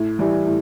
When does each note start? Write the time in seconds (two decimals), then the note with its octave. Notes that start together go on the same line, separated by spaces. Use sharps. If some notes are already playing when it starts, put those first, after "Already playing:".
Already playing: A2
0.19 E3 G3
0.45 A2